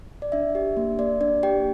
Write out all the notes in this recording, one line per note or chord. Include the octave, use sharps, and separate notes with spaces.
D5
D4 E5
G4
A#3
A#3 D5
D4 D5
G4 G5